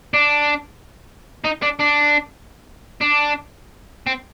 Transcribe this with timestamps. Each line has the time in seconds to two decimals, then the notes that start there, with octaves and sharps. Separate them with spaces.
0.14 D4
1.44 D#4
1.62 D4
1.79 D4
3.01 D4
4.07 C4